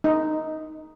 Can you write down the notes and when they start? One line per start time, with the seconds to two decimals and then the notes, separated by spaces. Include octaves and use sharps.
0.04 D#4